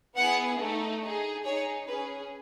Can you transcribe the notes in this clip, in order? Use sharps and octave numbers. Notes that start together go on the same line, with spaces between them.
B3 E4 G#4 F#5
A3 D#4 A4
D#4 G#4
D#4 G#4 C#5
C#4 G#4 B4